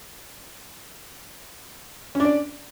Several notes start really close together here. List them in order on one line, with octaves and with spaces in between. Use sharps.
C#4 D4 D5